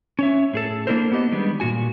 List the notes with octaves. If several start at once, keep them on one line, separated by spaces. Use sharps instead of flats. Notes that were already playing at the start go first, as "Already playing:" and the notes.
C#4 C#5 E5
A2 G#4 A4
A#3 B3 D4 E4 A#4 C5
B3 G4 D#5
D#3 G3 G#3 B3 D4
A#2 C#3 F#4 G#5